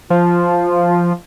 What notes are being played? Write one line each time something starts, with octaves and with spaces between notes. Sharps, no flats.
F3 F4